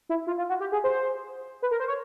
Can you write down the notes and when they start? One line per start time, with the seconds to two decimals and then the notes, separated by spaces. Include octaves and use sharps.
0.09 E4
0.27 F4
0.38 F4
0.49 F#4
0.60 G4
0.72 G#4
0.84 C5
1.62 B4
1.71 A#4
1.80 C5
1.88 C#5